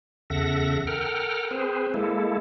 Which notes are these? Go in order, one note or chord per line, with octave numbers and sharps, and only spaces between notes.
E2 C#3 A4 E5 F#5 A#6
A4 A#4 F#5 G5 F6
C4 G#4 B4 C5
G#3 A#3 E4 A4